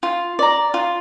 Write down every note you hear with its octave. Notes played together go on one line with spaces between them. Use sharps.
F4
D5 A#5
F4